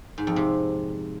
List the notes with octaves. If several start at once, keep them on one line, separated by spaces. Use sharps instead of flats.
G#2
F2
C3